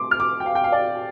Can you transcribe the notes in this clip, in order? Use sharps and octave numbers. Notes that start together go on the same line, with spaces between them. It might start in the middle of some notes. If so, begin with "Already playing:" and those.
Already playing: C3 A3 C6 D6
F6
D6
G5
F5
G5
F5
D5